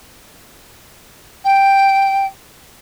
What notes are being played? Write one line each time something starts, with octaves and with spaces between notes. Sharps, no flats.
G5